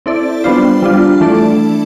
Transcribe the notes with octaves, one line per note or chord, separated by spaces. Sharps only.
C4 E4 A4 D5
G3 B3 D4 F4 C5
G3 D4 F4
E3 A3 D4 A4 D5